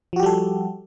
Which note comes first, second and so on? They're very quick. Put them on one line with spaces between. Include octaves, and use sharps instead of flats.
F3 F#4 G4 G3 A4